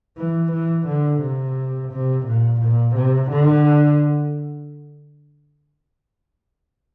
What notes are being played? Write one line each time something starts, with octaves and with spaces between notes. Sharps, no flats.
E3
E3
D3
C3
C3
A#2
A#2
C3
D3